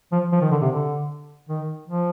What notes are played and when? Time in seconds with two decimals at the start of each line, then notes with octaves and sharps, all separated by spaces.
0.12 F3
0.32 F3
0.41 D#3
0.51 D3
0.62 C3
0.71 D3
1.49 D#3
1.88 F3